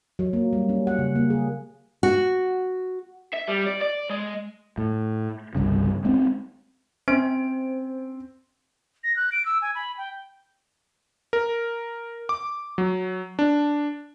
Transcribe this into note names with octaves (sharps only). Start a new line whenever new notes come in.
F#3
A#3
G3
C#4
F#5
C#3
A#3
G#4
F#4
E5
G3
D5
D5
G#3
A2
G1 C2 G2 C#3
G#3 C4 C#4
C4 C#4 C5 D7
A#6
F#6
D7
E6
G#5
B5
G5
A#4
D6
F#3
D4